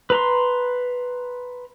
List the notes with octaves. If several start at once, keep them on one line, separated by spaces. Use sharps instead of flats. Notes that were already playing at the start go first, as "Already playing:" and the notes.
B4 A#5 C6